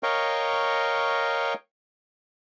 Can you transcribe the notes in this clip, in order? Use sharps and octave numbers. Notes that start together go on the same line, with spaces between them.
A#4 C#5 D#5 F5 G5 C#6